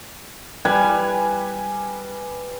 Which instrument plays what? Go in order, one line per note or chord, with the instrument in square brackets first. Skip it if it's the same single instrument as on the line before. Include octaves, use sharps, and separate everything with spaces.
[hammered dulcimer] G3 B4 G#5